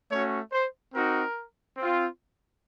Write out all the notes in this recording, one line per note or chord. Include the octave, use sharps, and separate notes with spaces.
A3 C#4 F#4 C#5
C5
C4 D#4 F#4 A#4
C4
F4